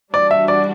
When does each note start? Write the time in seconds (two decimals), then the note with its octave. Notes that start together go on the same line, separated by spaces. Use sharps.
0.14 E3 G3 D4 F#4 D5
0.31 E5
0.48 D5